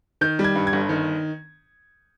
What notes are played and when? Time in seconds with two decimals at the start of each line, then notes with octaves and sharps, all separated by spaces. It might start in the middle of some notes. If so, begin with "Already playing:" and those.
0.21 D#3 G6
0.39 G3
0.44 G#6
0.55 G2
0.67 G#6
0.73 G1
0.89 D#3